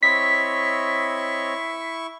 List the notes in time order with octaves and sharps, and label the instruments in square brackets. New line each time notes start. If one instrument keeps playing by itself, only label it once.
[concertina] C4 C#5 D#5 [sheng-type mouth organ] E4 C#6 [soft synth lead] B6